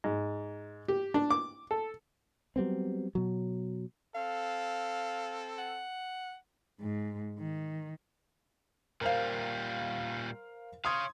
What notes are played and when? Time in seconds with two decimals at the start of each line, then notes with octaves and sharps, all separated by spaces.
0.04 G#2
0.88 G4
1.14 D4
1.30 D6
1.71 A4
2.56 F#3 G3 B3 C4
3.15 B2 F#3
4.15 C4 A4 F5
5.58 F#5
6.80 G#2
7.38 D#3
9.01 A#2 G3 A#4 C5 F5
10.85 C#5 F5 C6 D#6 G#6